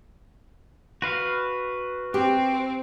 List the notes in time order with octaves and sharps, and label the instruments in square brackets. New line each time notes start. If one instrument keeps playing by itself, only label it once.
[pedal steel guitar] F#4 B4 F5
[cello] C4 [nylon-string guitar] G4